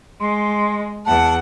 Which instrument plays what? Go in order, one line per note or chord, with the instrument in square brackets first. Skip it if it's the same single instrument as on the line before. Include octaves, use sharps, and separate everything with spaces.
[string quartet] G#3 [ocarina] C6
[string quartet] E2 F#5 [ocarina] A5